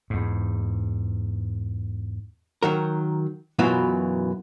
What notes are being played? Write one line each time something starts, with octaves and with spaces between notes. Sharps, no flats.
E2 G#2
D#3 F#3 A#4
F#2 B2 E3 F#3 E4 F4